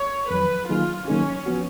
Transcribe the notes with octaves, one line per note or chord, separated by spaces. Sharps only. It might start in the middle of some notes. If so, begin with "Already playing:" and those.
Already playing: C#5
F2 D#3 F#3 B4
D#3 F#3 A#3 D#4 F4 G#4
D#3 F#3 A#3 C#4 D#4 G#4
F3 B3 F#4